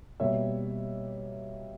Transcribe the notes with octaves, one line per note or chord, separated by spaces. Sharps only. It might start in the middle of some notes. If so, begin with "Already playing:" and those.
B2 G3 A#3 C#5 E5